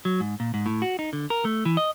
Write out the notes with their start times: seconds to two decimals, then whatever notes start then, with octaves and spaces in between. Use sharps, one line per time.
0.05 F#3
0.20 G#2
0.40 A#2
0.54 G#2
0.66 A2
0.82 F#4
0.99 D#4
1.13 D3
1.30 A#4
1.45 A3
1.65 E3
1.77 D#5